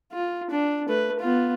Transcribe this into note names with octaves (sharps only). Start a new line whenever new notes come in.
F4
D4
A3 B4
B3 F4